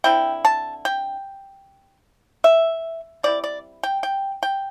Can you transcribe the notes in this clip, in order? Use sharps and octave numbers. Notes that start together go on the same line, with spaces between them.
D3 C4 E4 G5
A5
G5
E5
G3 C4 E4 D5
D5
G5
G5
G5